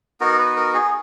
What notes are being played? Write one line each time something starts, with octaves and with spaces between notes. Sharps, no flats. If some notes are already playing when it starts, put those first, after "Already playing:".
B3 D#4 F#4 A#4
B4
A#4
G#4